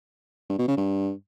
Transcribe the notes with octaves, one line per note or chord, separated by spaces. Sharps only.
G2
B2
C#3
G2